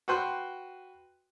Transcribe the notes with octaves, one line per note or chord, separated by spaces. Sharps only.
F#4 B4 G5 C6 F#6